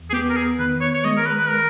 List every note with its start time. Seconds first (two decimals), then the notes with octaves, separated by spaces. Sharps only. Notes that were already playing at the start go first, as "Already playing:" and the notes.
Already playing: E2
0.10 G#4
0.13 B3 G4
0.30 A#4
0.36 G#4
0.59 D#3 B4
0.81 C#5
0.94 C#5
1.04 G#3 D#5
1.17 A#4
1.26 B4
1.38 B4
1.49 A#4